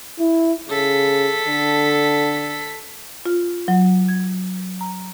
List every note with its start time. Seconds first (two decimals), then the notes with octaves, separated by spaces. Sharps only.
0.19 E4
0.69 C#3 A4 B6
1.48 D3
3.26 F4
3.68 F#3
4.08 G#6
4.81 A#5